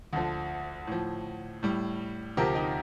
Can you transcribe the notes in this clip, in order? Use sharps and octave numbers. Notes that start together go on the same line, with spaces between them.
D2 D3 F3
A2 F3
A2 G3
D2 C3 F3 G4 A#4
D#4 G4